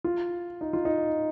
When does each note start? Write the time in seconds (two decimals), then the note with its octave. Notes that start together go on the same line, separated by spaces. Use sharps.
0.04 F4
0.61 D#4
0.73 F4
0.85 D#4